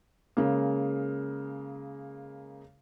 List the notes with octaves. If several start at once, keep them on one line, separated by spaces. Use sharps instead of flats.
C#3 G#3 A#3